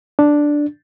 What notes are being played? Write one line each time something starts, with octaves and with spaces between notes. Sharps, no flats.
D4